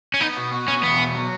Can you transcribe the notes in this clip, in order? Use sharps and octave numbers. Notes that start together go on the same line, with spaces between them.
C#4
B3 D#4
B2
F#4
B2 C#4
E2 B3
B2
F#3